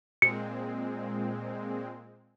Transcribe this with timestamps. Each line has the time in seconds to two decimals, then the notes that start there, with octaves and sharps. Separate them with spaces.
0.22 A#2 G#3 C4 C#7